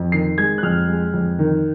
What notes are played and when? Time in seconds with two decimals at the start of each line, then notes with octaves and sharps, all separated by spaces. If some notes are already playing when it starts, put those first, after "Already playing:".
Already playing: F2
0.12 D#3 C7
0.38 G#3 G#6
0.58 F#6
0.63 F2 F6
0.88 G#3
1.14 F2
1.39 D#3